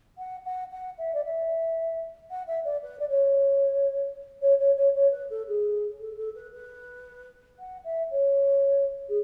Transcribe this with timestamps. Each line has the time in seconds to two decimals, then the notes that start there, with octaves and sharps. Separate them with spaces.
0.18 F#5
0.45 F#5
0.71 F#5
0.98 E5
1.14 D5
1.24 E5
2.30 F#5
2.47 E5
2.64 D5
2.82 B4
2.99 D5
3.09 C#5
4.41 C#5
4.58 C#5
4.76 C#5
4.94 C#5
5.11 B4
5.30 A4
5.48 G#4
6.00 A4
6.17 A4
6.35 B4
6.53 B4
7.59 F#5
7.84 E5
8.11 C#5
9.09 G#4